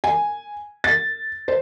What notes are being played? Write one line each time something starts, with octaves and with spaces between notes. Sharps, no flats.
G#5
A6
C5